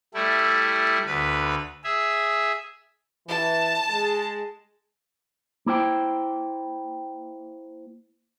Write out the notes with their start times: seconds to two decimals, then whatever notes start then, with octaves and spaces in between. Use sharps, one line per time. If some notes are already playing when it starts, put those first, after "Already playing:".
0.14 G3 A3 E4
1.07 D2 B4 B5
1.84 G#4 E5
3.27 E3 A5
3.89 G#3 G#4
5.66 A#3 E4 C5 G5